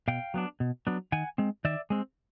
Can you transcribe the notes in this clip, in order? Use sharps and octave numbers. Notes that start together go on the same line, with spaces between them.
B2 F5 G5
F#3 B3 D4
B2
F#3 B3 D4
D#3 F#5 G#5
G#3 C4
D#3 D5 E5
G#3 C4